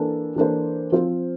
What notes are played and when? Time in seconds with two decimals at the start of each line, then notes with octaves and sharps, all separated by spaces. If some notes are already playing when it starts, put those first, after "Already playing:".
Already playing: E3 A#3 D4 A4
0.36 E3 A#3 D4 A4 C5
0.92 F3 C4 F4 C5